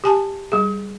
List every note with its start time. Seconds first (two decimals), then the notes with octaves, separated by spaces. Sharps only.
0.04 G4 G#5 A5
0.52 G3 G#4